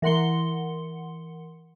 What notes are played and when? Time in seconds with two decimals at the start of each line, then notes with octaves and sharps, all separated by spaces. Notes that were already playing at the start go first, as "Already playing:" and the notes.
0.02 E3 A#4 F#5 C6 C#7 G7